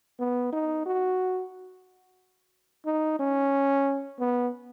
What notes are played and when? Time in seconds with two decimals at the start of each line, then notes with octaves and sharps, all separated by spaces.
0.19 B3
0.53 D#4
0.86 F#4
2.86 D#4
3.19 C#4
4.19 B3